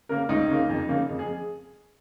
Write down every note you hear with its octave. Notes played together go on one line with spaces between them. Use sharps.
C#3 A#3 A#4
C#2 D#4
C#3 A#3
F2
C#3 A#3
F2
G#4